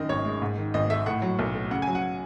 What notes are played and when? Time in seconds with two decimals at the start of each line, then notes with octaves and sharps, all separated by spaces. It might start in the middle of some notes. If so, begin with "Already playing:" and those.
Already playing: F#2 D#3 D#5
0.09 G#1 C#5
0.25 G#3
0.42 G#2
0.58 D#3
0.74 G#1 D#5
0.90 A3 E5
1.06 A2 F#5
1.22 F#3
1.39 B1
1.54 A3
1.71 C#3 F#5
1.82 G#5
1.87 F#3
1.95 F#5